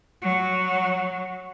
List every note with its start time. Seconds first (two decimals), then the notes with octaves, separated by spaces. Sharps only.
0.22 F#3